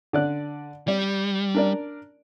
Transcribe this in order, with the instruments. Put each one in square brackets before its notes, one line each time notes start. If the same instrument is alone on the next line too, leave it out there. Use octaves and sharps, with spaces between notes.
[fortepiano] D3 D5 F#6
[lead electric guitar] G3 [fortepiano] D5
[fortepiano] D4 A#4 D5